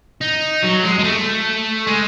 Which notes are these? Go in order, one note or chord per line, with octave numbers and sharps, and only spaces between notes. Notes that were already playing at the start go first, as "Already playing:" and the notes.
D#4
F#3
G#3
G#3
A3
G#3